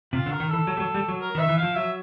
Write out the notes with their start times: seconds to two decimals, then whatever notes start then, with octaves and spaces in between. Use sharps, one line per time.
0.13 C3 F4
0.26 D3
0.32 A#4
0.40 D#3
0.49 E3 A4
0.67 F#3
0.77 G3
0.80 F#3
0.95 G3
1.08 F#3
1.21 A#4
1.35 D#3 E5
1.48 E3
1.57 F5
1.63 F3
1.76 F#3 E5